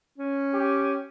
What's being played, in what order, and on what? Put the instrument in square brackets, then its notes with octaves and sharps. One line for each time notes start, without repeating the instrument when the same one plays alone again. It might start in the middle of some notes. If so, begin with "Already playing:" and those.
[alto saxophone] C#4
[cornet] G4